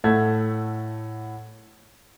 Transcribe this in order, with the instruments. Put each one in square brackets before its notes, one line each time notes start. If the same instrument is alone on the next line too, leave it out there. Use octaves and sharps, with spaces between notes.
[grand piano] A2 F#5 G#6 [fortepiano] A3